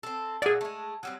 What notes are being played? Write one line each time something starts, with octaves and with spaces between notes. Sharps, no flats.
C4 A4
A#2 F#3 E4 G#4 D5
G#3 A3
F#3 G3 C4